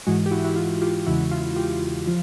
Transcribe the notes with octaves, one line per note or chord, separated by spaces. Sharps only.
G#2 E3 G#3 F#4 G#4
G4
E4 F#4
E4 F#4
F4
F4 G4
E2 C#3 E3 G#3 E4 F#4
F4
F4 G4
F3 F4